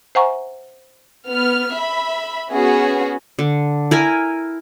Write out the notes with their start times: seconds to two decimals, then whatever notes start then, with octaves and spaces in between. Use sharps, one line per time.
0.15 C5 E5 F#5 G#5 A#5 C#6
1.29 B3 F6
1.75 E5 B5
2.52 B3 C#4 F#4 G#4
3.39 D3
3.91 E4 A#4 G#5